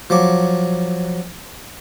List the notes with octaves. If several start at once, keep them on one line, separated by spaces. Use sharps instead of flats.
F3 F#3 D6